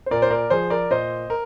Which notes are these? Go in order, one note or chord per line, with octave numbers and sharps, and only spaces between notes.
C5
A#2 A#4 D5
C5
A#4 D5
F3 G#4 C5
A#4 D5
A#2 C5 D#5
A#4